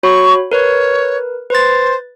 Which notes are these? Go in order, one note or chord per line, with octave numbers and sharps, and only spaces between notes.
F#4 C#5 B5 C#6
A#4 B4 C#5
B4 C5 A6